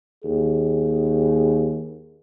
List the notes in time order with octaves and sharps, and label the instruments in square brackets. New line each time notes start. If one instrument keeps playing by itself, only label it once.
[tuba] D#2 [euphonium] G#4